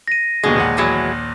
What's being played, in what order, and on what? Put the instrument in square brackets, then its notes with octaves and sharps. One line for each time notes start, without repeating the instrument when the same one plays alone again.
[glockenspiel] A#6 D#7
[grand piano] D#2 B2 D3 [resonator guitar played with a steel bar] G#3
[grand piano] A#1 D#2 F#5
[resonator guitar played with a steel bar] E2 F#3 G#3